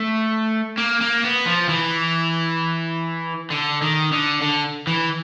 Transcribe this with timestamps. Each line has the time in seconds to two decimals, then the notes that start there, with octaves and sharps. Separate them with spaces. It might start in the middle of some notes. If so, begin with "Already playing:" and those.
Already playing: A3
0.78 A#3
1.01 A#3
1.24 B3
1.46 F3
1.69 E3
3.51 D3
3.82 D#3
4.12 D3
4.41 D3
4.87 E3